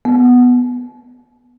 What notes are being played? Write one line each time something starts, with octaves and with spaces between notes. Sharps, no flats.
B3